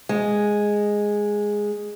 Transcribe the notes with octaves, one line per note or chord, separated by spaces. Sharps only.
G#3